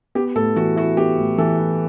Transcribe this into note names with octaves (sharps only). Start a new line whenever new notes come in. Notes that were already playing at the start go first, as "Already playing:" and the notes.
B3 G4
A2 A4
E3 F#4
E4 F#4
B3 G4
A2
E3 A4
E4